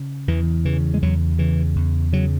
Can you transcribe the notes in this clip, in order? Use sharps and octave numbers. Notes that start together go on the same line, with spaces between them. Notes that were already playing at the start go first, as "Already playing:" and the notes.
Already playing: C#3
E2 E3
C#3 E3
G#3
E2 F#3
C#3 E3
E2
C#3 F#3